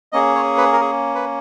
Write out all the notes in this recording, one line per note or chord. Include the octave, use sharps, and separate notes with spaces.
A#3 C#4 G#4 D#5
C#5
B4
A#4
G#4
B4